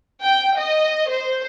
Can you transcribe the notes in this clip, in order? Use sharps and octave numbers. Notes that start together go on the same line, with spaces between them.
G5
D#5
C5